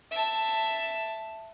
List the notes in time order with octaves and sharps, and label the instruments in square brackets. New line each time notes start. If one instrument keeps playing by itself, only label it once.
[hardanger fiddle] E5 A5